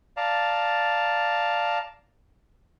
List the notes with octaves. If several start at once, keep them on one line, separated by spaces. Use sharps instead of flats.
D5 F5 A5 A#5